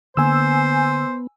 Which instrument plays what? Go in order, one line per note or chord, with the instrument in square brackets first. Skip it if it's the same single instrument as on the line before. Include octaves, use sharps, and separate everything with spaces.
[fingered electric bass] D3 A#3 [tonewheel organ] B3 [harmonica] C5 [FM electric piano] G#5 E6